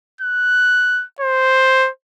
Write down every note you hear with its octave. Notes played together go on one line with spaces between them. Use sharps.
F#6
C5